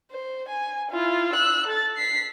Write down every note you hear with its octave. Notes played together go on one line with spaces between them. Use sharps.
C5
G#5
E4 F4
E6 F#6
A4 A6
B6 C7